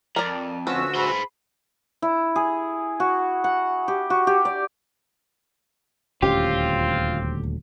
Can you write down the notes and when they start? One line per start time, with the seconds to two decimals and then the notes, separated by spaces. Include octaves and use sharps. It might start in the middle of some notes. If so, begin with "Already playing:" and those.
0.16 F2 A#4 D5
0.67 D2 F3 C#4 F4 F#4 B4 E6
0.96 G#4 C5 B5
2.02 E4
2.36 G#4
3.00 F#4
3.44 F#5
3.88 G4
4.10 F#4
4.27 G4
4.45 D5
6.22 D#1 D2 C4 C#4 F4 G4